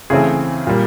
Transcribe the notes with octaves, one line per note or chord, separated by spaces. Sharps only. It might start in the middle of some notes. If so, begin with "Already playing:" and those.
C#3 E3 A3 C4 G#4
A#2 G3 A#3